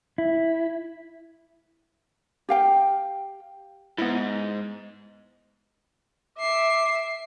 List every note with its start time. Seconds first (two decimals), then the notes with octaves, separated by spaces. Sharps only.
0.18 E4
2.49 G4 F5 G5
3.98 G#2 B3 E4
6.38 E5 D6 C7